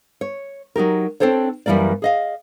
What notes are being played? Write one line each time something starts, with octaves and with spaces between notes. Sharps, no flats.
C#5
F#3 D#4 G4 A#4
C4 D4 A4 C5 C#5
F#2 E3 G3 A#3 D5
G#4 D#5 F5